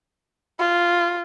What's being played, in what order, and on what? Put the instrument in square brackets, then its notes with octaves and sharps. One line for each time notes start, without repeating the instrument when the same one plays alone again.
[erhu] F4